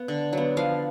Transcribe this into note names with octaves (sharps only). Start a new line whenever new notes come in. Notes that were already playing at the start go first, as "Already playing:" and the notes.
Already playing: B3
D3
F#3 B3
F3 F5